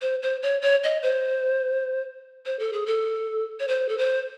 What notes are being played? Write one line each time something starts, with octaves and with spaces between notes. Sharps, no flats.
C5
C5
C#5
C#5
D#5
C5
C5
A4
G#4
A4
C#5
C5
A4
C5